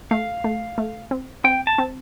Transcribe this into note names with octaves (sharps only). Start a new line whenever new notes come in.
A3 F5
A3
A3
C4
C4 G5
A5
C4